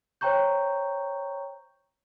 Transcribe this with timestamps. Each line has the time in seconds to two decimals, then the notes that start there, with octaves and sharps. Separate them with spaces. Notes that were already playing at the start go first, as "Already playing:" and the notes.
0.21 C5 C#5 G5 A#5 C#6 G6